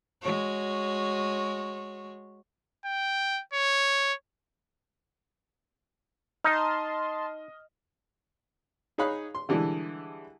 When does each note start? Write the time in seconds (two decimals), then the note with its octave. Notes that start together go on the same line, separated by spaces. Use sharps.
0.22 G#3 F#4 C#5
2.85 G5
3.53 C#5
6.44 D#4 D#5 A5 C6 D#6 F6
8.98 D#4 G#4 C#5 F5 B5 F#6
9.35 C6
9.49 D3 E3 G3 G#3 D4 E4